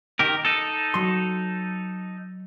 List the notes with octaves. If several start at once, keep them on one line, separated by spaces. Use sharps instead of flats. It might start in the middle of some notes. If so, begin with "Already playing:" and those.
D#3 G4 A#4
D#4 A4
F#3 C6